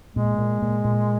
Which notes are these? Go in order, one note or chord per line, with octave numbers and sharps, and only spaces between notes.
A#2 G#3
A#2
A#2
A#2